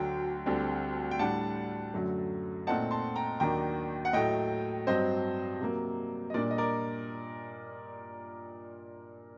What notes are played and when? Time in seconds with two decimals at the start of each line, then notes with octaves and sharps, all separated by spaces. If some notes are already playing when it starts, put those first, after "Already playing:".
Already playing: D2 D3 F#3 G5
0.46 D2 D3 G3 C4
1.11 G5
1.19 A2 G3 D4 F#5 A5
1.94 F#2 D3 F#3 A3
2.67 A#2 A3 C4 D#4 F#5 A5
2.91 A5 C6
3.16 G5 A#5
3.40 D#2 D#3 F#3 A#3 D4 G5 A#5
4.05 F#5
4.13 A2 F#3 A3 D#5 G5
4.87 G2 F#3 C4 C5 D#5
5.60 C3 F#3 A#3
6.30 D#5
6.34 A#2 G3 A#3 D4 A#4 D5
6.51 D#5
6.58 A#4 D5